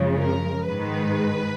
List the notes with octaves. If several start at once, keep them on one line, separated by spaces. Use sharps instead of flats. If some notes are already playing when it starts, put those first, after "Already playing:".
Already playing: F#2 C#3 F3 G#3
A#4
G#2 D#3 G#3 B4